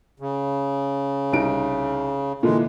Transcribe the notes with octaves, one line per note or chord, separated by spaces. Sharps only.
C#3
C2 D#4 D7
A#2 D3 E3 G#3